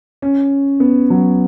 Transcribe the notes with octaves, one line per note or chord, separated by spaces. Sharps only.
C#4
B3
F#3